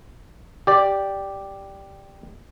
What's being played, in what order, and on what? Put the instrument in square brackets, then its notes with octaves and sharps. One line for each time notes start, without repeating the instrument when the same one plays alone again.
[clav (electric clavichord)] G4 D5